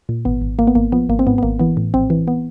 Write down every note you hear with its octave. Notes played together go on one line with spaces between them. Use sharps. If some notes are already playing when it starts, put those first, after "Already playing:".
A#2
G#1 B3
G#1
G#1 A#3
B3
G#1 A#3
F3 B3
G#1 A#3
C4
G#2 B3
B3
G#1 A#3
E3 B3
A2
A#1 C4
E3
B3